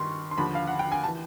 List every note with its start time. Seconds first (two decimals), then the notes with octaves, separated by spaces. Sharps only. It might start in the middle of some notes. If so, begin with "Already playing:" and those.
Already playing: G2 D#3 C6 C#6
0.31 C6
0.38 D#2 D3 F3 B5
0.55 F5
0.67 F#5
0.79 G5
0.92 G#5
1.04 A5
1.07 E3